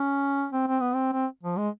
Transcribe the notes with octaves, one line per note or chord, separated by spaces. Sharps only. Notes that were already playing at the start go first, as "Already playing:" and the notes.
Already playing: C#4
C4
C4
B3
C4
C4
F3
G#3